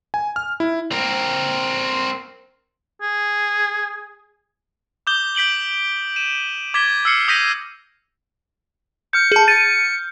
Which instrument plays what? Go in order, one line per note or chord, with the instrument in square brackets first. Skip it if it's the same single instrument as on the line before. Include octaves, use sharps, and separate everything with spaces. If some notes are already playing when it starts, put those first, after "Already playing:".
[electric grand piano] G#5
F6
E4
[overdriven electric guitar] C4 A#4
[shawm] G#4
[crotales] D6 D#6 G6 G7
G6 B6 D7 F#7 G7
D#7 E7
D6 G#6 A6 B6 G7
E6 F6 C7 C#7
D#6 G6 A#6 B6 D#7
[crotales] F6 G6 [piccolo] C#7
[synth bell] G#4 A5
[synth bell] A6 D#7 [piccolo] C#7